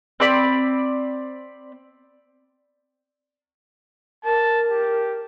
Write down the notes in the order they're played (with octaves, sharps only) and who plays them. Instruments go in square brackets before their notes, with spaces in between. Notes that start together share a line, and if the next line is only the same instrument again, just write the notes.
[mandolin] C4 D5 B5
[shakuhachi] A#4 [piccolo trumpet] A5
[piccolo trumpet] G4